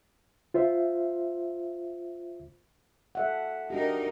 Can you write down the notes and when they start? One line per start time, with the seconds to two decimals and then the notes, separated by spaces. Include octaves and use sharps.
0.54 F4 C5 E5
3.15 A4 E5 F#5
3.70 D4 D#4 F#4 G4 A#4